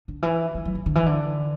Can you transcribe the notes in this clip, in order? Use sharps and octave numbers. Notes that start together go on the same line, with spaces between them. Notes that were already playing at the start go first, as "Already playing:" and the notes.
D3
E3
G3
F#3
E3
D3
E3
D3